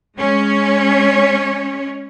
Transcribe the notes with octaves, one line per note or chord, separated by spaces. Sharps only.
G#3 C#4 C#5